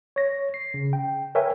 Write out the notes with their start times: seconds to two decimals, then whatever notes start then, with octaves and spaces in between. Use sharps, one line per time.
0.16 C#5 A#6
0.54 C7
0.74 C#3
0.93 G5
1.35 A#4 B4 C#5 E5 G5 G#5